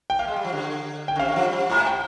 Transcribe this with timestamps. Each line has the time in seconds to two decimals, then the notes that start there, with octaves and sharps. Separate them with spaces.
0.10 G5
0.19 A#3 F5
0.27 G#3
0.36 G3
0.45 F3
0.53 D3
1.08 G5
1.16 D3
1.19 C3 F5
1.28 D3
1.36 F3
1.45 G3
1.53 F3
1.70 G#2 A#5
1.79 G#5
1.87 G5